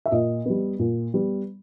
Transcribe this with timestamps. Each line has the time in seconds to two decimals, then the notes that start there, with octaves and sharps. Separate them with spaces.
0.06 E5
0.11 A#2 D#5
0.45 G3 B3
0.79 A#2
1.14 G3 B3